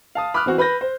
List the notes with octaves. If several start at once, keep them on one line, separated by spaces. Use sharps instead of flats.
F5 A5 D#6
B5 D6 D#6 F6 F#6
E3 C4 F#4
B4 B5 G6 A#6
C5